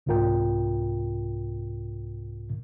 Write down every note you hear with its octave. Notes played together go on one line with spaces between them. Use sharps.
C2 G#2 C3 F4 A#4 G5